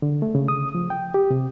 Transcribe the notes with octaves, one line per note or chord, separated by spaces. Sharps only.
D3
A3
C#3
D#6
F3
G5
G4
C3